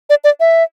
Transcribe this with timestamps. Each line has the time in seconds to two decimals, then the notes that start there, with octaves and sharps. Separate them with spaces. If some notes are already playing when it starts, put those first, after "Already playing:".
0.10 D5
0.24 D5
0.40 E5